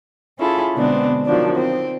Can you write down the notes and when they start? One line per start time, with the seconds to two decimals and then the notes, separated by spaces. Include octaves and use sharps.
0.39 C#4 E4 F4 G#4 A4
0.74 B2 D3 G#3 B3 C4 D4
1.26 D#3 F3 F#3 D4
1.56 C4